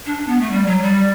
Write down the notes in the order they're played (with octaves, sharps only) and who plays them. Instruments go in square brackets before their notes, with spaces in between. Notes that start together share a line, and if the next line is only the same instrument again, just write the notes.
[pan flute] D4
D4
B3
A3
G3
F#3
G3